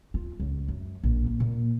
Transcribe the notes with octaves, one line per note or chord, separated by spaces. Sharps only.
F4
C#2
F#2
A#1
A#3
A#2